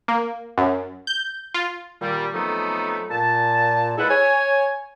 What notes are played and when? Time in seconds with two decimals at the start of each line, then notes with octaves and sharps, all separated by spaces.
0.08 A#3
0.58 F#2
1.07 G6
1.54 F4
2.01 A#2 D#3 G3
2.35 F2 F#3 A3 B3 D#4
3.11 A#2 A5
3.98 G#3 E4 A4 B4 F#5
4.09 C#5 G#5